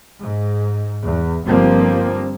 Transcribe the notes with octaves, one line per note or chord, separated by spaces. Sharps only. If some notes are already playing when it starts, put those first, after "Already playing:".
G#2
E2
G1 F3 G3 A#3 C4